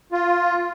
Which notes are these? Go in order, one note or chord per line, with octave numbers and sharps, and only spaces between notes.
F4